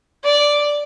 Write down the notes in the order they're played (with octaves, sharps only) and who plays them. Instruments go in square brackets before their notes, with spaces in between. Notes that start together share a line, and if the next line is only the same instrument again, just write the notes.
[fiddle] D5